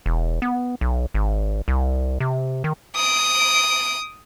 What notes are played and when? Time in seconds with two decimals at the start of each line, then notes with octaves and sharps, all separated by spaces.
0.06 E1
0.42 B3
0.81 B1
1.14 G#1
1.68 C2
2.20 C3
2.64 D#3
2.95 D#6 D7